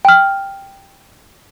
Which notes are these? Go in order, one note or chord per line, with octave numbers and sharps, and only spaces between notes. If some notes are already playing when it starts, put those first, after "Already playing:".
G5 F6